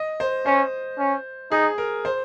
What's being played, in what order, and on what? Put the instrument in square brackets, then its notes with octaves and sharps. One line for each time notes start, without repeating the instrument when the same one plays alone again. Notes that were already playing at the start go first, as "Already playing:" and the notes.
Already playing: [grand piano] D#5
C5
[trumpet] C#4 [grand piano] C5
[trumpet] C#4
[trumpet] D#4 [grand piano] G#4
[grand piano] A#4
C5